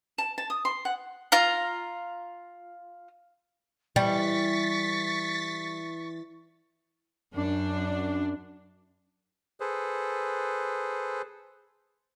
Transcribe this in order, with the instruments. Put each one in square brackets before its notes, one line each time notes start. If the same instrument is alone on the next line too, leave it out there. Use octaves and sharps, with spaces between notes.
[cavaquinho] A5
A5
D#6
C6
F#5
[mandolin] F4 F5 A#5
[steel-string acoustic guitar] E3 [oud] G3 [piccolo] C#6 [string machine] A6 B6
[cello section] F#2 D4
[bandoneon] G#4 A4 B4 C5